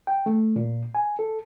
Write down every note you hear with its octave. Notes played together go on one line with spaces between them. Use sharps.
G5
A3
A#2
G#5
A4